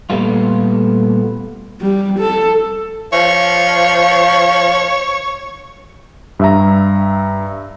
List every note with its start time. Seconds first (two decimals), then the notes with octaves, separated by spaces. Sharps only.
0.10 A#2 G3 A3 B3 F4
1.80 G3
2.20 A4
3.12 F3 C#5
6.39 G2 E5 A#5